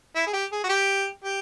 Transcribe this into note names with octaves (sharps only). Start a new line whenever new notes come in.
E4
G#4
G4
G#4
F#4
G4
G4